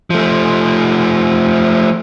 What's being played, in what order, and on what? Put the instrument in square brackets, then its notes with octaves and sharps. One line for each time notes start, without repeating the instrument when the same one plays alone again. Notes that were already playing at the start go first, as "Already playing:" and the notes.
[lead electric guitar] F3 A3